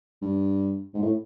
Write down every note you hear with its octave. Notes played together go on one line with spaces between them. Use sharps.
G2
G#2
A2